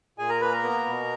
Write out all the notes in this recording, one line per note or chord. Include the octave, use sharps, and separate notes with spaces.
A#2 G#4 G#5
A#4 A#5
A#3 B4 B5
A#4 A#5
B3
B2